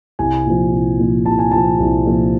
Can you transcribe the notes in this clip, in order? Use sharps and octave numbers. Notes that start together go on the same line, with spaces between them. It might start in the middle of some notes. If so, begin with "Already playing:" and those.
C2 G#5
A#2 F3
C2
A#2 F3
C2 A5
G#5
A#2 F3 A5
C2
A#2 F3